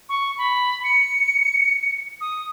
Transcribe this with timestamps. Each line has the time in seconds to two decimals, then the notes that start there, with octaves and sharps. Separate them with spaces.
0.09 C#6
0.38 B5
0.84 C#7
2.21 D#6